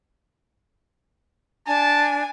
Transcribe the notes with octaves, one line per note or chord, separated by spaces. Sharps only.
D4 G#5 A5